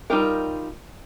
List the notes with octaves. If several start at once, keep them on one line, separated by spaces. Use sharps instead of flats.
G3 D#4 F4 G4 A#4